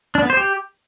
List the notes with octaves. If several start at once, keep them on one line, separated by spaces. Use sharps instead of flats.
D4
B3
C5
G4